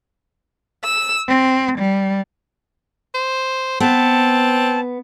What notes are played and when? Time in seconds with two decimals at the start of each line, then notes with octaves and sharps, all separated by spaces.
0.84 E6
1.28 C4
1.79 G3
3.14 C5
3.80 B3 C4 A5